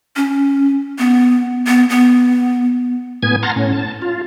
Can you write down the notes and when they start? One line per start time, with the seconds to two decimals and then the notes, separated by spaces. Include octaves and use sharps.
0.16 C#4
0.99 B3
1.67 B3
1.90 B3
3.23 A2 B3 G#5 G#6
3.43 F#5 A5 A#5 C6 F6
3.56 A2 C#4
3.73 A5
4.02 F4